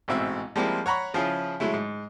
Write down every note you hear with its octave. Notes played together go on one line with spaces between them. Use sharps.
A1 G#2 B2 C4 E5
F3 G3 G#3 A#3 C4 E4
C#5 F#5 A#5 B5 C#6
C#3 F3 C#4 E4 F4 G#4
F#3 G#3 A3 E4
G#2